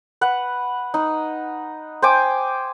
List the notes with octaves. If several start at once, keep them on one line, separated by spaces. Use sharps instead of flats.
B4 F#5
D#4
C5 G5 G#5 D6